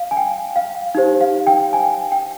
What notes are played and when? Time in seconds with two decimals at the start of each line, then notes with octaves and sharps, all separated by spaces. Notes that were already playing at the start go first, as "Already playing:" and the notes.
Already playing: F5
0.11 G#5
0.17 G5
0.56 F5
0.95 D#4 G4 C5
1.21 F5
1.47 G5
1.73 G#5
2.12 G5